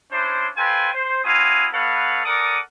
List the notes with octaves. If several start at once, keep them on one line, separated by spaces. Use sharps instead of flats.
C#4 D4 E4 C5
F4 A4 B4 C5 G5 G#5
C5
C4 E4 F#4 F5 G#5 D#6
B3 A4 B4 C#5 F5 F#5
A4 A#4 D5 F#5 D6 D#6